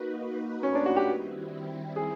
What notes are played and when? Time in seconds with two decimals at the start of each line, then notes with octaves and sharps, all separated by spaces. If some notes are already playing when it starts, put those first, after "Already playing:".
Already playing: A#3 D#4 F#4 B4
0.63 C#4
0.75 D4
0.86 F#4
0.96 G4
1.08 D#3 G3 C4 E4
1.96 G#4